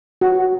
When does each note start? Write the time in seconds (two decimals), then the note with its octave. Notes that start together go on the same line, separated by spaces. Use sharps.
0.21 F#4